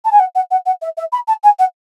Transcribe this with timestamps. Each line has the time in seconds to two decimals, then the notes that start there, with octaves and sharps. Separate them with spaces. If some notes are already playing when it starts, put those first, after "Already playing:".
0.04 A5
0.11 G#5
0.19 F#5
0.35 F#5
0.50 F#5
0.65 F#5
0.81 E5
0.97 E5
1.12 B5
1.27 A5
1.43 G#5
1.58 F#5